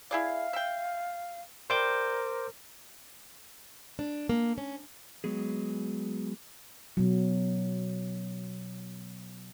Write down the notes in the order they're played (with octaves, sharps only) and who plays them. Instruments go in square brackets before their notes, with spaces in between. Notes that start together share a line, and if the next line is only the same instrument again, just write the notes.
[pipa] E4 G#4 D5 [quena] F5
[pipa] E5 G5
[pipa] G3 D5 G5 [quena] A#4 [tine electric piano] C5 D6 G6
[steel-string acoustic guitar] D4
A#3
C#4
[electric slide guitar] F#3 G#3 B3 G#4
[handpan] B2 F#3